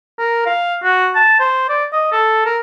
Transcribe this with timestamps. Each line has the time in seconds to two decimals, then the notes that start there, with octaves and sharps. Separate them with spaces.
0.19 A#4
0.46 F5
0.84 F#4
1.15 A5
1.40 C5
1.69 D5
1.93 D#5
2.12 A4
2.45 A#4